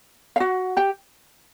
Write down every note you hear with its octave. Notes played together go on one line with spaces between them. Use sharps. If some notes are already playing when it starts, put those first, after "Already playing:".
F5
F#4 F#5
G4 G5